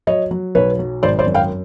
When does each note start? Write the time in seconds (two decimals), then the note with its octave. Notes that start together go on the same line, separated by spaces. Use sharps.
0.07 F#3 C#5 D#5
0.31 F#3
0.55 B1 B4 C#5
0.79 F#3
1.03 G#1 C5 D5
1.19 C5 D5
1.27 F#2
1.34 F5 G5